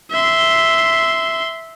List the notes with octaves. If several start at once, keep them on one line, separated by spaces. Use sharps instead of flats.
E5 C6